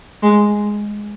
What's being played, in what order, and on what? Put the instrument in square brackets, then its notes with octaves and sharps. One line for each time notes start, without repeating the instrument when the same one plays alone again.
[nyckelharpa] G#3